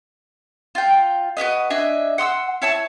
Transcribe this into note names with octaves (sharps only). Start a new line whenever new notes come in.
F4 G5
F#4 G4 B4 D#5
D4 D#5 E5 G#5
F#5 C6 D#6 E6
E4 C#5 A5 E6